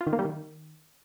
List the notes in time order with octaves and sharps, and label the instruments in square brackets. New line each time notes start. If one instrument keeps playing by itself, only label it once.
[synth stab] F4
D#3
A#3
G3
D#3